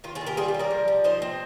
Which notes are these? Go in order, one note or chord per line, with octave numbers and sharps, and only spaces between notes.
D#3 F4
F4 G#4
D#3
G4 A#4
G3 F4 G#4
G4
G3
A#4 D5
F3
F3
D#4 C5 D#5
C4